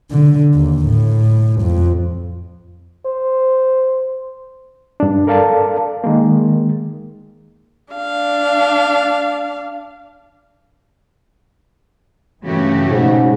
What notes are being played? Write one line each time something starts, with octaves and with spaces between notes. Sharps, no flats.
D3
D#2
A2
F2
C5
G2 D4
A4 A#4 D5 F5 A5
D#3 G#3 A#3
D4 F5
G2 C#3 E3 A3 F#4 G4
G#2 B2 G#3